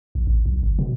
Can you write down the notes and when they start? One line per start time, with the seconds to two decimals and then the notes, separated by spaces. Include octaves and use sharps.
0.15 A#1
0.27 A1
0.46 B1
0.63 G1
0.79 B2